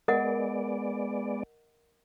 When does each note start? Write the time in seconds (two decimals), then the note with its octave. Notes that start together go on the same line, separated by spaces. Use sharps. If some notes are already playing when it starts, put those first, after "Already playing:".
0.08 G#3 B3 A#4 D5 D#5 F#5